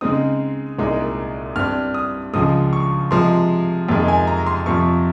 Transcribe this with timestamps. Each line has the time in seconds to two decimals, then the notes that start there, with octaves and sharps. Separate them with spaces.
0.01 C#3 G#3 C4 D#4 D#6
0.79 C2 A#2 G#3 D#4
1.56 G2 G3 C4 F6
1.94 D#6
2.33 C#2 C#3 F3 G#3 D#6
2.73 C#6
3.11 C3 F3 G#3 C6
3.89 F2 C3 D#3 G#3
4.08 G#5
4.27 A#5
4.46 C6
4.66 F2 C3 F3 C#6